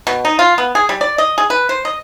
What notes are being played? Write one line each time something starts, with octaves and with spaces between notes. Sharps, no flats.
B2
D#4
F4
B3
G#4
G3
D5
D#5
G#4
B4
C5
D#5